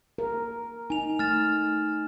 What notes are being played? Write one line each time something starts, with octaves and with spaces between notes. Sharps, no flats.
A#4
D#4 G#5 F7
A3 F6 A6 E7